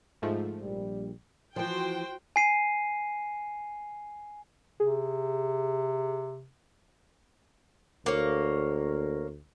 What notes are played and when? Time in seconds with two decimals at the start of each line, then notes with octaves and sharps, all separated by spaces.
0.22 G#2 F3 A3
0.60 A#1 G3
1.56 E3 F3 F#4 C5 G5
2.36 G#5 C7 D#7
4.80 C3 G#4
8.06 D2 A#3 C#5